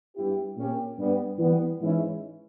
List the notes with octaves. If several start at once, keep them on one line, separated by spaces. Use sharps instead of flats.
G2 G3 B3 E4 G4
A#2 A#3 C#4 G4
G2 G3 B3
E3 G3 B3
G#2 E3 G#3 C#4 E4